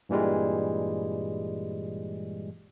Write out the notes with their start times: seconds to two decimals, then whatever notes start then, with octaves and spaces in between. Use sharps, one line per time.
0.09 G2 A#2 E3 G3 G#3